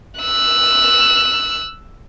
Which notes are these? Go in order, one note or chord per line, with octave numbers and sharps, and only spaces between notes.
E6 F#6